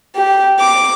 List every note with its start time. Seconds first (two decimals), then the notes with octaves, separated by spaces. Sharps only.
0.16 G4
0.59 D6